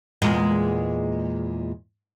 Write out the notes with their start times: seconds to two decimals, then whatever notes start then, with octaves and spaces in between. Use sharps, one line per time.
0.22 E2 A#2 G#3